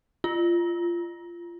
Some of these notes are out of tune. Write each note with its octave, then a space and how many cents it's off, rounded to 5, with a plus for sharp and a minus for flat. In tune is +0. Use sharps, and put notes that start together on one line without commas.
F4 -20